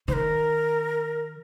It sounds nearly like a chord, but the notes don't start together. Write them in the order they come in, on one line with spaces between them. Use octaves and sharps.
D#3 C5 A#4